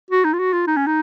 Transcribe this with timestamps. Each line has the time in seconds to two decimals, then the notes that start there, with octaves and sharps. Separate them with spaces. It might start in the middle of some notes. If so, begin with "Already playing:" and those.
0.11 F#4
0.25 D#4
0.33 F4
0.39 F#4
0.53 F4
0.67 D#4
0.77 C#4
0.87 D#4